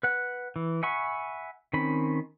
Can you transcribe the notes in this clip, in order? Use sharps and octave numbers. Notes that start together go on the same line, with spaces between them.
B4 F#5
E3
E5 F#5 G#5 B5 C#6
D#3 C4 C#4 B5